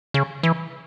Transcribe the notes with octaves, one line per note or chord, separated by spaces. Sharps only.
C#3
E3